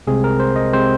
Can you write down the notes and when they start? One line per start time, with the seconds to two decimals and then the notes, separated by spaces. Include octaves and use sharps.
0.07 C2 C3 G#3 C4 G#4
0.24 A#4
0.40 C5
0.56 D#5
0.73 C3 G#3 C4 C5